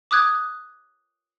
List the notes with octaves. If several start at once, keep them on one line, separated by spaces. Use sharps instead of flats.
D6 D#6 F#6 G#6